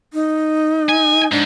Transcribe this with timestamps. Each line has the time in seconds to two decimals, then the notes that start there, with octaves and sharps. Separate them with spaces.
0.14 D#4
0.89 G#5
1.32 G#2 D4